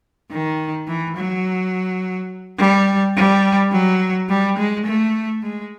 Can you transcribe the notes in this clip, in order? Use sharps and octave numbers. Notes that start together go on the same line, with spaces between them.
D#3
E3
F#3
G3
G3
F#3
G3
G#3
A3
G#3